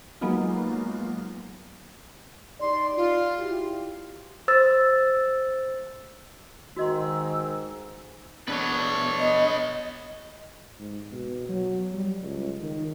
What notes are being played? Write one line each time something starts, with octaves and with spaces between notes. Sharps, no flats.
F#3 G#3 A#3 B3 D#4 F4
D#4 G4 D5 C6
F4
E4 F#4 G4
C5 E6 A6
G#2 D#3 F#4 D#5 C6 E6
B2 D4 B4 C#5
D#5
G#2
B2
F#3
G3
C#2
D#3